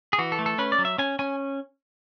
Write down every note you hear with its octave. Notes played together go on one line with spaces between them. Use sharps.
G#4
E3 F#4
A4
A3
A4
C#4 B4
D5
F#3
E5
C#4 G#5
C#4 G#5